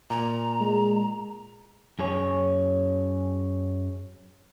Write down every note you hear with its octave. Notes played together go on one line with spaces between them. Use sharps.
A#2 A#5
G#3
F#2 G#4 C#5